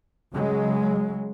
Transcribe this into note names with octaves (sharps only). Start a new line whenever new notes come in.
C#3 F#3 G#3